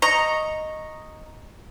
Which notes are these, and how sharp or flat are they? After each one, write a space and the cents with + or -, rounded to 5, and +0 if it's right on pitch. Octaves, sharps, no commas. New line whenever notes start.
D#5 +0 A#5 +0 C#6 -10